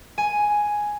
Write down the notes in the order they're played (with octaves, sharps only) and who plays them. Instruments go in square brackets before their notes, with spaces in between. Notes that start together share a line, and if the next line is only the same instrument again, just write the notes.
[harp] G#5